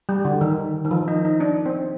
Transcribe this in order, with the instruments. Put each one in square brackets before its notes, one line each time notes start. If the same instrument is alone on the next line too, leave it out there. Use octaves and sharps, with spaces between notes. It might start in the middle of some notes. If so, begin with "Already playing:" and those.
[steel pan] G3
D3
D#3
D#3
F3
D#4
D#4
D4
C4